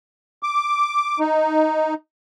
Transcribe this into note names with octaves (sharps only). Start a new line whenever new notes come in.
D6
D#4